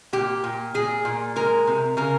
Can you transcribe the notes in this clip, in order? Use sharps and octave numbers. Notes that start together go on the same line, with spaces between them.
A#2 G4
A#2
A#2 G#4
A#2
G#3 A#4
C3
C#3 A#4